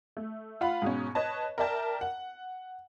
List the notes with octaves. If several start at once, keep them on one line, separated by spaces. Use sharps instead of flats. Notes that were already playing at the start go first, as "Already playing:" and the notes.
A3
F4 F5 F#5 B5
G#2 B2 C#4
B4 C#5 D#5 A5
A#4 D5 E5 G5 A5
F#5